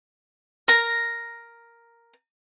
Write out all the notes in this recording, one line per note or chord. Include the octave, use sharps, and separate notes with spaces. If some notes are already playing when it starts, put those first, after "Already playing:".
A#4 A#5